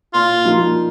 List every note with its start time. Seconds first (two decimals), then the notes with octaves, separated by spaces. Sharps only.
0.13 A#2 F4
0.45 F3 A#3 D#4